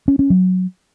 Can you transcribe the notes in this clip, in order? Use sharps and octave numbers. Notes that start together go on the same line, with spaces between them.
C#4
C#4
F#3